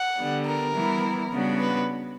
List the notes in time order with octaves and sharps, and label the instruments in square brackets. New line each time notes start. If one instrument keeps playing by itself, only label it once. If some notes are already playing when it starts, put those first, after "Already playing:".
Already playing: [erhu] F#5
[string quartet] D3 G3 B3
[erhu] A#4
[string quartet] E3 G3 B3 E4
C#3 G3 B3 D4 F#4
[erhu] B4